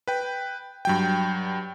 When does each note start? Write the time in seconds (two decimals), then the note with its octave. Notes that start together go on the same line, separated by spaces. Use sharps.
0.08 B4 G5
0.85 G2 F#3 G5